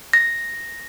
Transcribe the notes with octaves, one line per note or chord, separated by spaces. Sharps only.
A#6